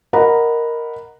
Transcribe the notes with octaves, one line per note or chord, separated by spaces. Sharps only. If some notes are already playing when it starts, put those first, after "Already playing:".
A#4 D#5 F#5 A#5 B5